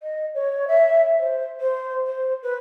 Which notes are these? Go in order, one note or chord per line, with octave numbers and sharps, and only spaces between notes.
D#5
C#5
E5
C5
C5
C5
B4